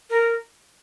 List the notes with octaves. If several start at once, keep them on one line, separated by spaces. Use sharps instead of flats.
A#4